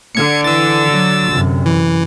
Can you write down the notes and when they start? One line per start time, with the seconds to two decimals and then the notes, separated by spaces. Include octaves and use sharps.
0.15 D3 G#6 C#7
0.44 E3 E6 A6
0.90 F#3
1.31 F#2 C3
1.66 E3